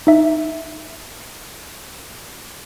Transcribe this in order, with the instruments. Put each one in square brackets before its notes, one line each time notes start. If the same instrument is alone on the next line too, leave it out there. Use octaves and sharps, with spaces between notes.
[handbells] D#4 E5